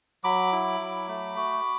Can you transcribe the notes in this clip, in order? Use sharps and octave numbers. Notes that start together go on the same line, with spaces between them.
F#3 B5 D6
E4
F#3
A3
F#4